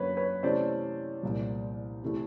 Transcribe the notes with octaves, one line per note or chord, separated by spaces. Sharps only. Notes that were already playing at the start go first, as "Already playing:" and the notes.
Already playing: F#2 D3 F#3 A#3 C#4 B4 C#5
B4 C#5
C3 E3 A3 C#4 C5 D5
C2 A#2 F3
C3 E3 A3